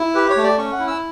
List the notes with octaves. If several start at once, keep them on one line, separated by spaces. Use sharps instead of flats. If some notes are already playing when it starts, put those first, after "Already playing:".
Already playing: E4
G4 B4
C#5
A3
D5
C#4 C#6
F#5
E4
E6